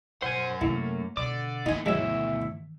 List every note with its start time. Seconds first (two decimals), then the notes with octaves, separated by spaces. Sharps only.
0.22 F#2 B2 C5 F#5 G#5
0.61 C3 A3 A#3 C#4 E4
1.17 B2 D3 E3 D5 D6
1.66 A#2 D#3 E3 A3 D#4 G#5
1.86 D2 B2 F#3 G#3 A3 E4 E5